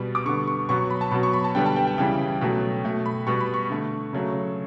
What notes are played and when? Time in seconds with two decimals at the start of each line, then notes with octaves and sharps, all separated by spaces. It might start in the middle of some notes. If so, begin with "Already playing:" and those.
Already playing: B2 G3 B3
0.15 D6
0.26 D3 G3 B3 C#6
0.47 C#6
0.69 B2 F#3 B3 C#6
0.90 B5
1.01 A5
1.11 B2 F#3 B3 B5
1.23 C#6
1.33 B5
1.44 A5
1.55 D3 G3 B3 G5
1.66 A5
1.76 G5
1.87 G5
1.98 C#3 E3 G3 G5
2.41 B2 F#3 A3
2.84 B2 A3
3.06 B5
3.27 B2 G3 B3 C#6
3.40 B5
3.54 C#6
3.70 D3 A3
4.13 C#3 F#3 A3